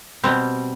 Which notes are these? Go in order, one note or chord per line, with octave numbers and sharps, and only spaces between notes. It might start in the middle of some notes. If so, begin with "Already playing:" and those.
B2 G3 C4